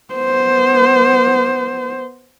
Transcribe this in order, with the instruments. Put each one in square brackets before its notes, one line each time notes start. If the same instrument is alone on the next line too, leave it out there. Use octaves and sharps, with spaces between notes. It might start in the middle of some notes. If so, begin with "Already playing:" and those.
[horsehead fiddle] B3 C5